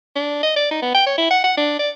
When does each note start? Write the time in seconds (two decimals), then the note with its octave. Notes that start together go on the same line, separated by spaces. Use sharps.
0.16 D4
0.43 D#5
0.56 D5
0.71 D#4
0.82 B3
0.95 G5
1.07 C#5
1.18 E4
1.31 F#5
1.44 F#5
1.57 D4
1.79 D5